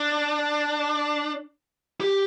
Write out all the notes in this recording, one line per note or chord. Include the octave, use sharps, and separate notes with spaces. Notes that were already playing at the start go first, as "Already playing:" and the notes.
Already playing: D4
G4